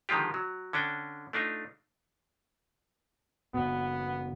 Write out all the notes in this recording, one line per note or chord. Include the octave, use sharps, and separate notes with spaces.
D3 D#3 F3 G#3 F4 G4
F#3
D3 C#4 D4 G5
A3 D4 D#4 F4
F#1 B2 B3